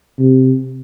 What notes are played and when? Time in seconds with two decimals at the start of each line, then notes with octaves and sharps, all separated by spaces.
0.18 C3